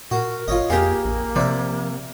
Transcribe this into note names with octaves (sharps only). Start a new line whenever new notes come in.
A#2 F#4 A#4
G#1 F4 C#5 D#5
F2 A#3 G4 G#4 F5
A#1
C3 F3 D5 E5